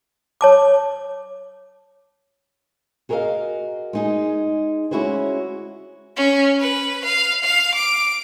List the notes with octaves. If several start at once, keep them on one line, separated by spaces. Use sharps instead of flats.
C#5 A5 D6
F#4 G#4 A#4 B4 D#5 F5
G#3 D#4 G#4
G#3 C#4 E4 F#4 G#4 C5
C#4
B4
F5
F5
D6